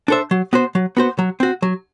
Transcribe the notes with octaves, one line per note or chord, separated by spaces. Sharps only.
D4 A4 C5 E5
F#3
B3 F#4 C5
F#3
B3 F#4 C5
F#3
C4 F#4
F#3